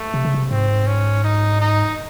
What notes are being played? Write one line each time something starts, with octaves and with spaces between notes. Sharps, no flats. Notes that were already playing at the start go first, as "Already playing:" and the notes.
Already playing: A3
C3
C#3
C3
G#2 C4
C#4
D#4
D#4